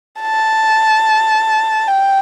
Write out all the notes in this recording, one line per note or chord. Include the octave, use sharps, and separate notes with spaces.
A5
G5